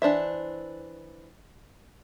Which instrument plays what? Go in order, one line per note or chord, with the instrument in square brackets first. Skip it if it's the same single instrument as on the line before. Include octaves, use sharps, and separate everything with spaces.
[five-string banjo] E3 D4 C5 E5